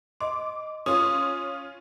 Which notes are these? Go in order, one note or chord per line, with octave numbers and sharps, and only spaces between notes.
D#5 C6 D6
C#4 F4 D#6